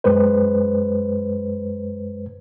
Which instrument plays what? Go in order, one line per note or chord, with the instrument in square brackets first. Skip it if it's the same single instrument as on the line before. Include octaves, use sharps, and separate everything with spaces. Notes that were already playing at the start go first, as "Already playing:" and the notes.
[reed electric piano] F#2 G#3 B4 C5